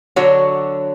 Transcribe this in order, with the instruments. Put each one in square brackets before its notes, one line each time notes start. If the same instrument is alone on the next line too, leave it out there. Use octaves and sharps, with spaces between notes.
[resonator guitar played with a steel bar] D3 F#3 D4 F#4 C#5